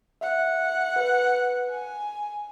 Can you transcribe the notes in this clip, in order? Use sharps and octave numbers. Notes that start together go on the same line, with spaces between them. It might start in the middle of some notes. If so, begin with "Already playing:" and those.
E5 F#5
B4
G#5